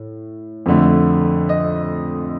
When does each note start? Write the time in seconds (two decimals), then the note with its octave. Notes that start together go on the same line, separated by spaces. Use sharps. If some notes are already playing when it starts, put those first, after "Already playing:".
Already playing: A2
0.66 F2 D3 A3
1.49 D#5